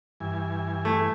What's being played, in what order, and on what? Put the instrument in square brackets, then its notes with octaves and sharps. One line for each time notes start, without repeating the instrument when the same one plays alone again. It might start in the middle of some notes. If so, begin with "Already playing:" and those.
[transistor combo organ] G2 E3 G#5
[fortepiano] A3